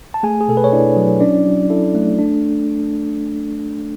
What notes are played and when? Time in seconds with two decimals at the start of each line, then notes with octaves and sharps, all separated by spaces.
0.14 A5
0.23 A3 G#4 G#5
0.40 G#4
0.48 B2 A4
0.57 B4
0.64 C#5
0.72 D4 E4 D5
0.97 F#3
1.21 C#4 D4 D5
1.46 F#3
1.70 E4 A4
1.95 A3
2.19 D4